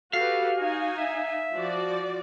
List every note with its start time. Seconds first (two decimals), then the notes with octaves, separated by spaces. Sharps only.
0.13 F#4 G4 A4 B4 F5
0.58 D#4 F#4 G#5
0.98 E5
1.53 F3 F#4 D5